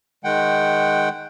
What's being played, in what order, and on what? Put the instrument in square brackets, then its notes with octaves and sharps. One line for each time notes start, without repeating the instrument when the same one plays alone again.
[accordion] D#3 G#3 F#5 G5